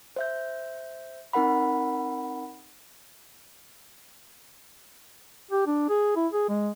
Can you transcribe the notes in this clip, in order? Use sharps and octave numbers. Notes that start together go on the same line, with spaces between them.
C5 E5 G6
C4 D#4 A#4 F#5 B5
G4
D4
G#4
E4
G#4
G#3